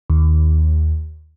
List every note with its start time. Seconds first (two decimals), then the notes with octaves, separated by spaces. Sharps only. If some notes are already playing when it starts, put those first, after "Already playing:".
0.10 D#2